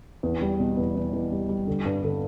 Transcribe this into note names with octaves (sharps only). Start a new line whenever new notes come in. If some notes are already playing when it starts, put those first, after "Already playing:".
E2
G3
B2
E2
E2
E2
G3
G3
D3
G2
D3